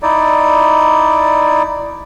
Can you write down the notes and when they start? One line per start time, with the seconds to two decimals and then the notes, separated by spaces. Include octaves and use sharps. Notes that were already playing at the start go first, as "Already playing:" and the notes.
0.02 D#4 E4 D5